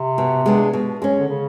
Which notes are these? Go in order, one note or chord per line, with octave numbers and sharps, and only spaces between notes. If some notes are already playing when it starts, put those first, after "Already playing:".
Already playing: C3
B2
G#3 B3 D4
B2
G#3 C#4
D3
C#3